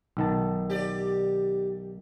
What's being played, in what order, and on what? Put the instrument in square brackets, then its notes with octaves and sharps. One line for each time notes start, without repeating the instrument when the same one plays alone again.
[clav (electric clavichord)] B1 D#3 A5
[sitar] G4 D5